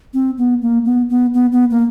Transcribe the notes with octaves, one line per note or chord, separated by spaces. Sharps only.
C4
B3
A#3
B3
B3
B3
B3
A#3